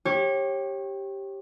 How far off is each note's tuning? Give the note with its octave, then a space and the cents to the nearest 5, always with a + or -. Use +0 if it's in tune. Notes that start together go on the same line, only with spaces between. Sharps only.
G4 +0 C#5 -30